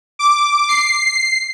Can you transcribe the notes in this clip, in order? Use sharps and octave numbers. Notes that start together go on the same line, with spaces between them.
D6
C7